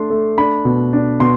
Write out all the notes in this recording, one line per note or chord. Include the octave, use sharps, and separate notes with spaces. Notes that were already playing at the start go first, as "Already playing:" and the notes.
Already playing: A3 D4 C6
A3
D4 B5
B2
D4
B2 C6